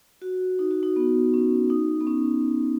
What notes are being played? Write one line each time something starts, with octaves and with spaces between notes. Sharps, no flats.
F#4
D#4
F#4
D#4
B3
C#4
D#4
B3
C#4